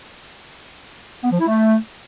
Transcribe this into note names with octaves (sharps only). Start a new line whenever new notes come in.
B3
F3
E4
A3